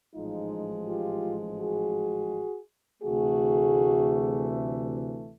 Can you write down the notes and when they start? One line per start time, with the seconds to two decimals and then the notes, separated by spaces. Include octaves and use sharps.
0.13 A1 G#2 F3 G#3 D#4 F4
0.86 F4 G4
1.57 F#4 G#4
3.02 D2 C3 E3 A3 F#4 G#4